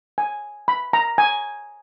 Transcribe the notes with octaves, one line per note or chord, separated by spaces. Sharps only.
G#5
B5
A#5
G#5